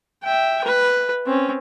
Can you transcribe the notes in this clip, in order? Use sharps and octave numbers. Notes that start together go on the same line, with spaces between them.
E5 G5
B4
C4 C#4